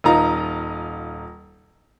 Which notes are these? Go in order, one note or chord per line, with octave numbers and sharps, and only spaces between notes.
D#1 D#4 F4 A#5